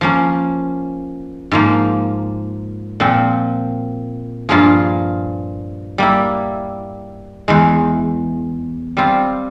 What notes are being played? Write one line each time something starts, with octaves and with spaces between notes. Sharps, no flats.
F3 A#3 C#4
G#2 F3 A#3
A#2 F3 C4
G2 F3 A#3 F4 G#4
G3 A#3 E4
E2 E3 G#3
G3 C4 F4